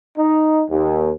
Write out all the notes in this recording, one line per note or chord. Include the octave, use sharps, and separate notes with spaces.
D#4
D#2